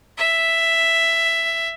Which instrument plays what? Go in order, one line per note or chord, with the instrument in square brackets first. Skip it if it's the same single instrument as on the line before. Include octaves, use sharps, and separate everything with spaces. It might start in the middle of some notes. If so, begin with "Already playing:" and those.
[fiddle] E5